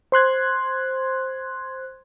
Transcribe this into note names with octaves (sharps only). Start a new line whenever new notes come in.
C5 C6 F#6 G#6